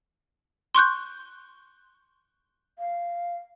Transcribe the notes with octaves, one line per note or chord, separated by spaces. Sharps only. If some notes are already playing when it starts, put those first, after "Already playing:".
C6 C#6 F#6 G6
F5